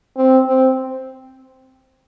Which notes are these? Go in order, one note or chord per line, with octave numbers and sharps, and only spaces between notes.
C4
C4